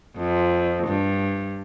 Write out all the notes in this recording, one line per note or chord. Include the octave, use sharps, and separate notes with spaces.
F2
G2